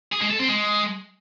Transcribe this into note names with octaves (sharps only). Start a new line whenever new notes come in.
G#4
G#3
A4
C4
G#3